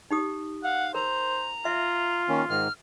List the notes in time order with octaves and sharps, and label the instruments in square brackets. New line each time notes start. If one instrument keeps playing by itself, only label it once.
[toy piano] D#4 G4 D#6
[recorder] F5 [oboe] F#5
[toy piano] A#4 [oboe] C5 [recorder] A#5
[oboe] F4 [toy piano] E5
[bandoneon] D#3 A#3 C#4
[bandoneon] G#2 D#3 [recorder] F6